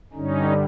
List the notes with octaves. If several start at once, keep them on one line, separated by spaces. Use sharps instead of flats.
G2 D3 G3 C#4 D#4